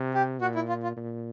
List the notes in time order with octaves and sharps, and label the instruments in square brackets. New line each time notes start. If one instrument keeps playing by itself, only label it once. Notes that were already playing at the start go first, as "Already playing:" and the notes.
Already playing: [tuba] C3
[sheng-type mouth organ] G4
[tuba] A#2 [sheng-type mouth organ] F#4
[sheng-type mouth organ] E4
F4
F4
[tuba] A#2